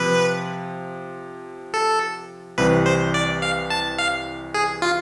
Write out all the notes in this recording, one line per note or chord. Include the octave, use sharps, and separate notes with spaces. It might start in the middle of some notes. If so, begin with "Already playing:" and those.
Already playing: C3 F3 B4
A4
C2 C3 E3 B4
C5
D5
F5
A5
F5
G#4
F4